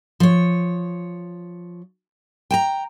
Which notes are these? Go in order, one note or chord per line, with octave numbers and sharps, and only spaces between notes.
F3 C#5
G5 A5 A#5